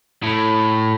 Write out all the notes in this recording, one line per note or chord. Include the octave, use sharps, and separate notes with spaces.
A2